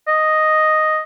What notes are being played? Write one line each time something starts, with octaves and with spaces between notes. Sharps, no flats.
D#5